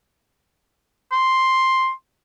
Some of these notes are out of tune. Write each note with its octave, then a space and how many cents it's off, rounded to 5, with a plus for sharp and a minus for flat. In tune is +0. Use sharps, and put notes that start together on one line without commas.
C6 +5